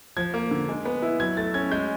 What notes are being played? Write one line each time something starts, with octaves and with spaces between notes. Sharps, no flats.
F3 G#6
A#3
D3
G#3
B3
E4
F#3 G#6
A3 A6
C#4 G#6
G#3 G6